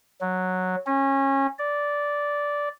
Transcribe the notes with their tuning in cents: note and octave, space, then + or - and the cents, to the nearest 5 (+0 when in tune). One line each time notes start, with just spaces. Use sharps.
F#3 -5
C#4 -25
D5 -10